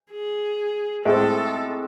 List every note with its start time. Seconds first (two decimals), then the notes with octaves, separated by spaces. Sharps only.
0.12 G#4
1.05 A2 G#3 C4 A4